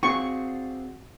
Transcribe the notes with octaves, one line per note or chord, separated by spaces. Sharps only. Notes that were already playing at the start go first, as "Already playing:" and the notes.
C4 F#4 G#4 D5 F5 C#6